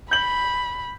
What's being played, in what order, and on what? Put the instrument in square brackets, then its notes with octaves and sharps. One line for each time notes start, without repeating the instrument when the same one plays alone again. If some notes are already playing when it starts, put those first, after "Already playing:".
[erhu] B5 [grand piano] G6 F#7